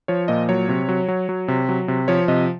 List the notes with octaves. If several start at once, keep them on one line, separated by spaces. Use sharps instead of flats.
F3 C#5
A#2 D#5
F#3 C#5
C3
F#3
F#3
F#3
C3
F#3
C3
F3 C#5
C3 D#5